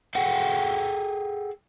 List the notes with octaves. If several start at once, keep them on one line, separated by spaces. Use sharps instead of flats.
G#4 A4 F#5 G5